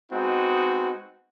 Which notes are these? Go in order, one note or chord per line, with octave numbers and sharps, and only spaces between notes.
G#3 B3 C4 D#4 F#4